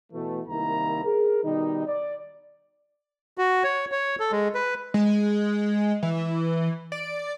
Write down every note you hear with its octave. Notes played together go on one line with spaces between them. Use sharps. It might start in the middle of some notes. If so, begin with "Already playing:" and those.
B2 E3 A3
C2 D#3 A#3 E4 A#5
G#4 A#4
B2 D#3 G3 D#4
D5
F#4
C#5
C#5
A4
G#3
B4
G#3
E3
D5